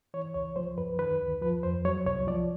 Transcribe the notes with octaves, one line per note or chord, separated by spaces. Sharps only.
E3 C#5
C#2 C#5
F3 C5
F#2 B4
D#3 B4
D2
F3 B4
F2 C5
F#3 C#5
C2 C#5
F3 D5